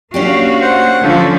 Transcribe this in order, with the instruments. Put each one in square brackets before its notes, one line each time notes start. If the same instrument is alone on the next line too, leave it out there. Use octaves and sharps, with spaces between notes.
[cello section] A#3 F#4 F5 [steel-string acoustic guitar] C#4 D4 G4
[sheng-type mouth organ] C5 F#5
[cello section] D3 F3 C#4 [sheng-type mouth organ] F4 A4 C5